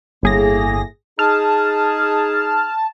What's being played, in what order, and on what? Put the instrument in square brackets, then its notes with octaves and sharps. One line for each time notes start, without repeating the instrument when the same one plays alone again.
[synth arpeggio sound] G1 G#4 A#6 [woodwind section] A2 A#3
[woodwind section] D#4 G#4 [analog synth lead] A5 [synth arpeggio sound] F6